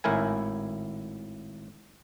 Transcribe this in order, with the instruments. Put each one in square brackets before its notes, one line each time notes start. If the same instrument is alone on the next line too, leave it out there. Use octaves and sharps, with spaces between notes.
[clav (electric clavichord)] G#1 A2 E4 A#4 G#5